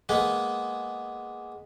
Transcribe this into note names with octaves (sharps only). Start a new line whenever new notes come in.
G#3 A#3 B3